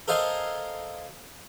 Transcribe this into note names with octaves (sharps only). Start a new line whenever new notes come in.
A4 A#4 C5 D#5 F5 G#5